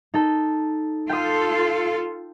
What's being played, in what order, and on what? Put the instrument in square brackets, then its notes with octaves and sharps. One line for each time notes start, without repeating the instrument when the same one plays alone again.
[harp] D#4 A4
[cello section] F4 A4 [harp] G5 D#6